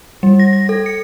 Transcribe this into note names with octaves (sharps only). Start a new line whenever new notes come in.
G3
A#6
A#6
A4
C#7